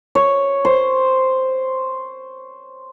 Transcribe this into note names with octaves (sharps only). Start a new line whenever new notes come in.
C#5
C5